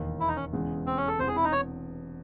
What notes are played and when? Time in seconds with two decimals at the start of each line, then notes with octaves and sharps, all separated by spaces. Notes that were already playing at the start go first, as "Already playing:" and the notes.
Already playing: E1 D#2 D#3
0.20 E4
0.28 D#4
0.36 C#4
0.53 E1 E2 C#3 G#3
0.86 C4
0.97 C#4
1.08 A4
1.19 E1 E2 C3 C5
1.28 G#4
1.36 E4
1.44 D#4
1.52 C#5